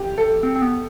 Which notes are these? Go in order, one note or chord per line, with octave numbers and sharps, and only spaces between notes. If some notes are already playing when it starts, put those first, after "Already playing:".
Already playing: G4
A4
C4
C4
B3